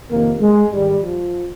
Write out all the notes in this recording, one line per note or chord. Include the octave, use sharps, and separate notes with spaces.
F2 C3 D#3 A#3
G#3
G#2 D#3 G3
F3